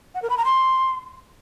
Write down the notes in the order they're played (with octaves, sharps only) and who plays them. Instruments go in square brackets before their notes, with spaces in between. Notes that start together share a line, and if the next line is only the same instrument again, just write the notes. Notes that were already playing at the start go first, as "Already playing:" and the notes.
[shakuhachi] F#5
A#4
B5
A#5
C6